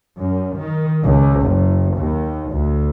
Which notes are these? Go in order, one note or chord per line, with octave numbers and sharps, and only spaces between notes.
F#2
D#3
C#2
F#1
D#2
D2